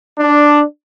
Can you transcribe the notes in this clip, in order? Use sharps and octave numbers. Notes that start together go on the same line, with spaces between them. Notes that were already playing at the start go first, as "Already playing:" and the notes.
D4